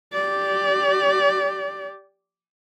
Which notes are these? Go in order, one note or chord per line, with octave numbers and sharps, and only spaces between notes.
G4 D5